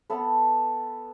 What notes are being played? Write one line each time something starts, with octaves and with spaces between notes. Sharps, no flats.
B3 A4 B4